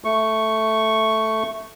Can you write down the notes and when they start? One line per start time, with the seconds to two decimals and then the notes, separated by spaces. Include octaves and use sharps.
0.04 A3 C#6